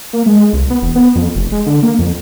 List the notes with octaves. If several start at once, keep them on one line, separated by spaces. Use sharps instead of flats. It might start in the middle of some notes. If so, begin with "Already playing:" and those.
A#3
G#3
C2
B3
E1
B3
F2
F1
G#3
D3
A#3
F2